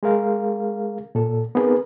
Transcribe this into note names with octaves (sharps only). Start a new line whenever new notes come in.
G#3 G#4 A#4 F5
A#2 A4
B3 C4 D#4 G#4 A#4 B4